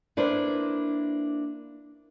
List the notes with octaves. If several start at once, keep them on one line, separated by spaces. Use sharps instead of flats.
A#3 D4 E4 B4 C5